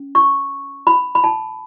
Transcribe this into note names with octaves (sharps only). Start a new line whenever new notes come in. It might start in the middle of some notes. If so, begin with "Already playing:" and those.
Already playing: C#4
C#6
B5
B5
A5